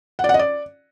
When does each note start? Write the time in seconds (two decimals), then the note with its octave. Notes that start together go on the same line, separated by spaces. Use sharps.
0.19 F#5
0.24 D5
0.29 F#5
0.34 D#5
0.39 D5